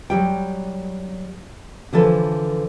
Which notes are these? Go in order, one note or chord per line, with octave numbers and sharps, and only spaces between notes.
F#3 G3 G5
D3 E3 F3 A4 B4